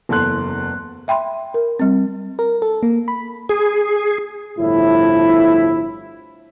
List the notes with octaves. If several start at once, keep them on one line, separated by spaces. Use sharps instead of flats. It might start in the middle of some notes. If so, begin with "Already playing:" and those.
F#1 E2 A4 C6 F#6
E5 G5 B5 C6
A#4
G3 C4
A#4
A4
A#3
B5
G#4
G1 A2 F3 E4